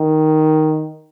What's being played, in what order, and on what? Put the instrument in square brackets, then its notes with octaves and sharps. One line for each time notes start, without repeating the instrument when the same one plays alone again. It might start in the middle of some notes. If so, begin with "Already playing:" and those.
Already playing: [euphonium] D#3